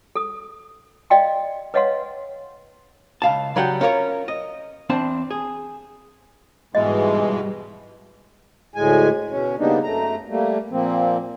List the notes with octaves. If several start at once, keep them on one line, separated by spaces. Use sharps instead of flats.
A4 D#6
D5 D#5 F5 G5 C6
B4 C#5 D#5 F5 F#5 C6
C#2 F5 A5
C#3 F#3 G3 F#5 G5
C#4 F4 A#4 C#5
D#5
E2 C4 D4 A5
G#4
G#2 B2 E3 G3 G#3 D#5
D2 A2 G#3 G#5
B2 C#4
C#3 G3 A#3 B3 D4 D#4
F#2 A3 A#5
G3 A3 A#3
A#2 F3 A#3 C4